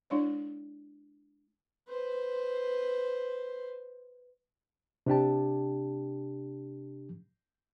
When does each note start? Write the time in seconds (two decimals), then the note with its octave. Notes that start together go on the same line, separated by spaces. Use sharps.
0.10 G#3 D4 E4 C#5 D5
1.88 B4 C5
5.06 C3 D4 G4 A5